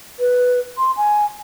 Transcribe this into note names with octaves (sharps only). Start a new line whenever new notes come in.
B4
C6
G#5